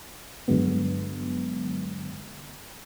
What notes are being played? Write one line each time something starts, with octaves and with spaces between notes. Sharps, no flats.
G2 D3 F#3 G#3 B3